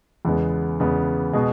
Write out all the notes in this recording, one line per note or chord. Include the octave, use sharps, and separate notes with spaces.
E2 C#3 G#3 B3
E2 C#3 G#3 B3
B2 G#3 B3 G#4